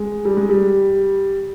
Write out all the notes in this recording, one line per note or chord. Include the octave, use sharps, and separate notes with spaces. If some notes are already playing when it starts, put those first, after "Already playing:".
Already playing: G#3
G3
G#3
G3